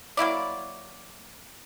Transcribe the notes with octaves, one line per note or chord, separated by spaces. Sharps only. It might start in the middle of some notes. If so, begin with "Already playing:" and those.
F#3 A#3 E4 D5